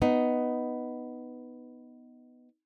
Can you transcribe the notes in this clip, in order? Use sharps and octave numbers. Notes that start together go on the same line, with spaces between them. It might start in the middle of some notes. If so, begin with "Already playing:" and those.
B3 D#4